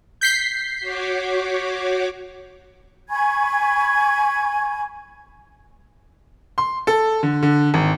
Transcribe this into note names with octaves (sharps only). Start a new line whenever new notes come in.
G6 B6 C7
F#4 C#5 D6
G#5 B5 C#6 G#6
C6
A4
D3
D3
G#1